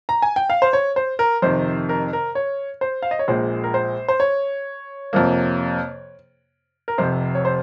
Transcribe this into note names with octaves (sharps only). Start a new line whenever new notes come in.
A#5
G#5
G5
F5
C5
C#5
C5
A#4
F2 C3 D#3 C5
A#4
A#4
C#5
C5
F5
D#5
C#5
A#1 A#2 G#3 C5
A#4
C5
C5
C#5
F2 C3 F3 A#3
A#4
F1 F2 C3 C5
C#5
C5